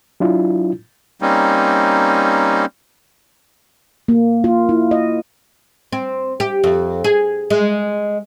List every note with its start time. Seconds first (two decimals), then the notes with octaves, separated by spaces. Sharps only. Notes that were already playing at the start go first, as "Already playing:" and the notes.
0.20 F#3 D4 E4 F4
1.22 G3 A#3 C4 C#4 D#4
4.08 A#3
4.44 F4
4.69 E4
4.91 D#5
5.92 C4
6.40 G4
6.64 F2
7.04 G#4
7.50 G#3